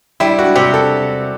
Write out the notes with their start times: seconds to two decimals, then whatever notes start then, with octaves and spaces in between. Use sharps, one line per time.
0.20 G3 E4
0.39 F#4
0.55 C3 G4
0.74 A4